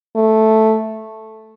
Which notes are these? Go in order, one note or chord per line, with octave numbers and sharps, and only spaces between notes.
A3